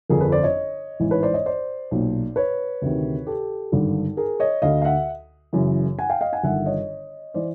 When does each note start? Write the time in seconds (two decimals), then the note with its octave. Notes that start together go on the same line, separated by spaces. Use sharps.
0.09 G1 F2 D3 G#4 A#4
0.21 A4 B4
0.32 C5 D5
0.43 C#5 D#5
1.00 A1 G#2 E3
1.11 B4 C#5
1.23 C5 D5
1.34 C#5 D#5
1.46 C5 D5
1.91 B1 A#2
2.36 B4 C#5
2.82 D2 C3 D#3
3.27 G4 A4
3.72 G#1 G2 D3
4.17 G#4 A#4
4.40 C#5 D#5
4.62 D2 D3 D#5 F5
4.82 F5
4.85 E5 F#5
5.53 F#1 F#2 C#3 E3
5.99 F#5 G#5
6.10 F5 G5
6.21 D#5 F5
6.33 F#5 G#5
6.43 G1 G2 D#3 E5 F#5
6.66 C#5 D#5
7.34 E3 C5 D5